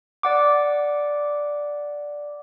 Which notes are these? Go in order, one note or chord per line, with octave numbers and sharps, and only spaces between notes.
D5 F#5 D6